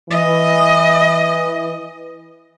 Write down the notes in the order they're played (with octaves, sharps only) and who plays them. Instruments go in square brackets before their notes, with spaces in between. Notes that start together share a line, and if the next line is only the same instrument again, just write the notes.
[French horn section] E3 [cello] D#5